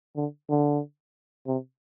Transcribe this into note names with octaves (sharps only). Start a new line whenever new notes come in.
D3
D3
C3